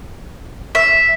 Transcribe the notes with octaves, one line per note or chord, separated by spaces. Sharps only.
E5